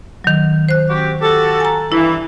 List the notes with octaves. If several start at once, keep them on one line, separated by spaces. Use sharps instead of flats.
D#3 F#3
C5 F#6
C4 F#4 G4
F#4 G4 A4
G#5 A#5
G2 E3 E4